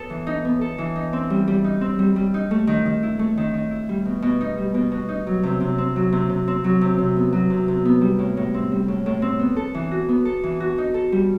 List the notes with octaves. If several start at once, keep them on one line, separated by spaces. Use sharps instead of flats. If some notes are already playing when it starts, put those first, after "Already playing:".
Already playing: B3 A4
E3
D#4
B3
A4
E3
D#4
C4
G3
G3
D#4
C4
G3
G3
D#4
A3
D#3
D#3
E4
A3
D#3
D#3
E4
G3
B2
B2
D#4
G3
B2
B2
D#4
F#3
C3
C3
C4
F#3
C3
C3
C4
F#3
C3
C3
B3
F#3
C3
C3
B3
G3
A2
A2
C4
G3
A2
A2
C4
B3
A4
E3
F#4
B3
A4
E3
F#4
D#4
A4
G3